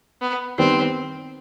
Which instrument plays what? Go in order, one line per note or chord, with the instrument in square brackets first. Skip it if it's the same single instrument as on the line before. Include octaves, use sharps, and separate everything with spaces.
[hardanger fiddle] B3
[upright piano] D#3 G3 B3 [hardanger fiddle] C4